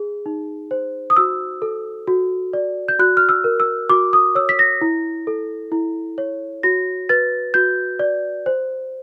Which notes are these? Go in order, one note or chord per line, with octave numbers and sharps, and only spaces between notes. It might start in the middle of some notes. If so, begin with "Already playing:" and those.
Already playing: G#4
D#4
C5
D#6
F#4 E6
A4
F#4
D5
G6
F#4 F#6
F6
E6
A#4
E6
F#4 D6
D#6
C#5 E6
B6
A#6
E4
A4
E4
C#5
F#4 A#6
B4 A6
F#4 G6
D5
C5